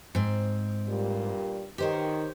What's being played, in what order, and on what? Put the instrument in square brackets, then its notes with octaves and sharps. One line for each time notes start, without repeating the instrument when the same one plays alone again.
[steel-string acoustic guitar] G#2 C4
[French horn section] G2 A#2 G3
[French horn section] D#3 [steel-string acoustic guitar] G4 C5 C#5